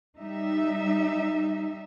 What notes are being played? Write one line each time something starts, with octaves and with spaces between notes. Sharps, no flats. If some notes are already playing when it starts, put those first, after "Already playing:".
G3 D#4 E5